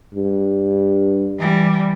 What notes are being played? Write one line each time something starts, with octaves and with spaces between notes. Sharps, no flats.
G2
E3 G3